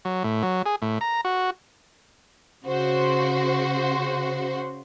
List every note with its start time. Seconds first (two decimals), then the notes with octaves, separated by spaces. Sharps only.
0.05 F#3
0.24 A2
0.43 F#3
0.66 G#4
0.82 A2
1.01 A#5
1.25 F#4
2.65 C#3 F#4 C5